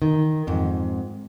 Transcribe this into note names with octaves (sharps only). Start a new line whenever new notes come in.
D#3
F2 G#2